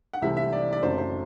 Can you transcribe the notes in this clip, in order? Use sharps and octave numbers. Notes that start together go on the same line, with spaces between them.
F#5
C2 C3 E3 A3 C4 E5
E5
D5
D5
F#1 F#2 F#3 A3 C4 C5
C5